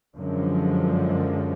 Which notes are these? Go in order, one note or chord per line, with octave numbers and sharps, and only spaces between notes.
F#2 D3 F3 G#3